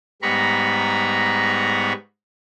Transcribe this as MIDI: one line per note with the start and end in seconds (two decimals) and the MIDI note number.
0.22 1.93 44
0.22 1.93 55
0.22 1.93 59
0.22 1.93 82
0.22 1.93 83
0.22 1.93 85